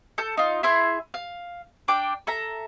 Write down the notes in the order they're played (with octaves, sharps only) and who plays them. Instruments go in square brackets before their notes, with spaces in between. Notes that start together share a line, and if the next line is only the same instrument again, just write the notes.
[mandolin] A4 A5 G6
D#4 F4
E4 G#4 E5 C6
F5
D4 G5 D6
A4 E5 A#5